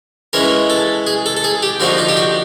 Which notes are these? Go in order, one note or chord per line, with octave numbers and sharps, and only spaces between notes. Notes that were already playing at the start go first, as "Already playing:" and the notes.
E3 G#3 C#4 E4 A#4
A4
G#4
A4
A4
G#4
G4
D3 F3 A#3 D#4 F#4
F4
G4
F#4